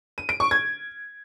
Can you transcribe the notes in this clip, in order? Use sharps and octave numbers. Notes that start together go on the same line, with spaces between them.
D#7
D7
C#6
G#6